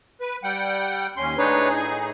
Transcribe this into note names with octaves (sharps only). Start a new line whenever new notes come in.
B4
G3 F#5 G5
D#2 C#4 C6
A2 D4 D#4 G#4 B4 C#5
G#5